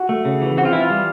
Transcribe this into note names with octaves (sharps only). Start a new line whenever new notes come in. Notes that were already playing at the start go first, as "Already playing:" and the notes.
Already playing: F#4
A3
C#3
E3
C4 F#4
F4
E3 E4
F4
G3